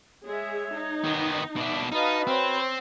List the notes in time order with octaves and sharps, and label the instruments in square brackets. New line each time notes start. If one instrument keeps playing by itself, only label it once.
[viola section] G#3 G#4 E5 [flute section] C#5
[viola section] D#4
[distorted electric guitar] D#3 B3
[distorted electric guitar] B2 D4 [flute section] E5
[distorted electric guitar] D#4 [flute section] F#4 B4 B5 [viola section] D#5 F5 A5
[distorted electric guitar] C4 [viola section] C5 C#5